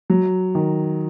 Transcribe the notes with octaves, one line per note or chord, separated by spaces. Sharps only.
F#3
D#3